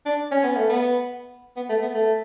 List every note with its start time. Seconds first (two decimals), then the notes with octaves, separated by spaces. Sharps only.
0.06 D4
0.31 C#4
0.44 B3
0.56 A3
0.69 B3
1.56 B3
1.69 A3
1.82 B3
1.94 A3